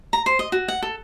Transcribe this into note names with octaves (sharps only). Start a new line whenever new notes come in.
A#5
C5
D#5
F#4
F#5
A4